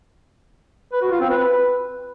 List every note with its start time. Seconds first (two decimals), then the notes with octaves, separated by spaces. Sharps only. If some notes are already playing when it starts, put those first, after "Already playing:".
0.93 B4
1.02 F#4
1.11 F4
1.21 C4
1.30 B4